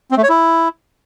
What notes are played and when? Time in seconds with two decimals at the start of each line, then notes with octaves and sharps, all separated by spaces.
0.11 C4
0.17 A3
0.23 C#5
0.29 E4